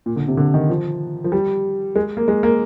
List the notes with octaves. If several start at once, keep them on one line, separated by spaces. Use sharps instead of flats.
A#2
D3
C3
D3
D#3
F3
F3
G3
G#3
A#3
G#3
A#3